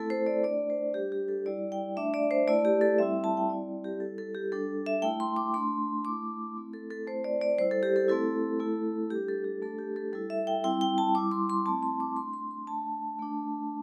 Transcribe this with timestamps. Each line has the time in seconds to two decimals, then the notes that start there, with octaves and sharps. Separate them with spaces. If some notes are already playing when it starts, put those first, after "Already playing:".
Already playing: A3 C4 E4 A4
0.10 C5
0.26 D5
0.43 A3 D4 D5
0.70 C5
0.94 G3 D4 G4
1.12 G4
1.28 A4
1.46 G3 E4 D5
1.72 G5
1.97 A3 D4 E5
2.14 D5
2.31 C5
2.48 A3 E4 D5
2.65 G4
2.81 A4
2.98 G3 C4 E4 E5
3.24 A5
3.37 G5
3.50 G3 C4 E4 D5
3.84 G4
4.00 G3 E4 A4
4.18 A4
4.35 G4
4.52 G3 D4 A4
4.86 E5
5.02 A3 E4 G5
5.20 C6
5.36 D6
5.54 A3 D4 C6
6.05 A3 E4 D6
6.56 A3 C4 E4
6.73 A4
6.90 A4
7.07 A3 C4 E4 C5
7.24 D5
7.41 D5
7.58 G3 E4 C5
7.71 A4
7.83 G4
7.96 A4
8.08 A3 C4 E4 A4
8.59 A3 E4
9.10 G3 D4 G4
9.28 A4
9.44 G4
9.62 A3 D4 A4
9.79 G4
9.96 A4
10.13 G3 E4 A4
10.30 E5
10.47 G5
10.64 G3 C4 E4 G5
10.81 G5
10.98 A5
11.15 G3 E4 D6
11.31 C6
11.50 C6
11.66 A3 C4 E4 A5
11.83 C6
12.00 D6
12.16 A3 D4 C6
12.33 C6
12.51 C6
12.67 A3 D4 A5
13.19 A3 D4